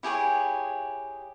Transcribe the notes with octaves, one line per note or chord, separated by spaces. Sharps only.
E4 G4 G#4 C#5